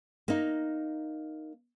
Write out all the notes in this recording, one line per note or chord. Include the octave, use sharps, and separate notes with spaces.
A#3 D#4